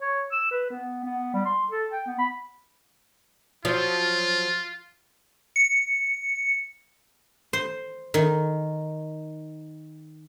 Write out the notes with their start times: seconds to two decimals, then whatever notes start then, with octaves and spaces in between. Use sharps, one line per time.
0.02 C#5
0.32 E6
0.51 B4
0.70 B3
1.04 B3
1.34 G3
1.45 C6
1.71 A4
1.92 G5
2.06 B3
2.19 B5
3.65 F3 F#3 F4
5.56 C#7
7.53 C5
8.14 D#3